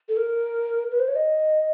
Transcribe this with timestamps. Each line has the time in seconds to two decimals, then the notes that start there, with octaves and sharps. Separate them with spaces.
0.09 A4
0.17 A#4
0.91 B4
0.99 C5
1.08 C#5
1.16 D#5